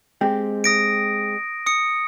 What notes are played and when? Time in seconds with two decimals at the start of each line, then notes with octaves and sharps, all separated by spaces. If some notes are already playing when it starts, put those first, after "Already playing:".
0.21 G#3 C4 G4
0.64 D#6 A#6 D7
1.66 D#6 C#7